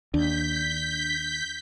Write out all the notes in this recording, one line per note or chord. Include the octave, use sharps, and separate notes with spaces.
D#2 D4 G6 B6